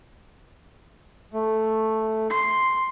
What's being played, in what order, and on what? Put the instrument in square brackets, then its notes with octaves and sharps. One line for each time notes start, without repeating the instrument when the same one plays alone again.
[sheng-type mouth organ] A3
[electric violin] C6